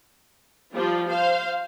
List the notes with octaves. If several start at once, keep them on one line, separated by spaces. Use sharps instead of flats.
F3 G3 F4
C5 F5